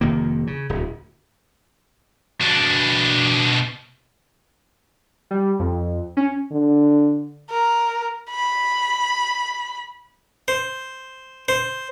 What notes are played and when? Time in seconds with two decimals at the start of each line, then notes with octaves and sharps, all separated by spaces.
0.01 F1 D#3 A#3
0.47 C#3
0.69 D1 D2
2.41 B2 D4
5.31 G3
5.59 F2
6.17 C#4
6.52 D3
7.50 A#4
8.31 B5
10.48 C5
11.48 C5